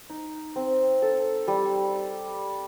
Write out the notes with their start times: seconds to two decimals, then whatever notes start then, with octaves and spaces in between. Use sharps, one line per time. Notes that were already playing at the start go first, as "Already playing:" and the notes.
0.10 D#4
0.56 C4
1.02 A4
1.48 G3